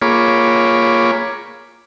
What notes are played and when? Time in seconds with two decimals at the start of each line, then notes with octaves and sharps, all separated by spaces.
0.02 A#3 F4 G#4 C#5 B5 D6